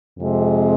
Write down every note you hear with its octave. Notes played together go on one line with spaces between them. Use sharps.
F2 C3 G#3